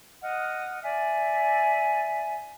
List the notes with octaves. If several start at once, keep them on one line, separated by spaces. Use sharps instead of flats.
D#5 F#5 F6
D5 E5 G#5